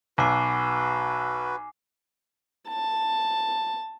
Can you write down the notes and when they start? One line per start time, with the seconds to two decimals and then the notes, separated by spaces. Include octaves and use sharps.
0.18 B1 F#4 B4 G#5 D6 C7
2.69 A5